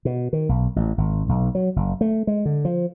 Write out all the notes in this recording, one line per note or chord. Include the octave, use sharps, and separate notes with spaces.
B2
D#3
B1
A1
G#1
B1
F#3
F#1
A3
G#3
D3
F3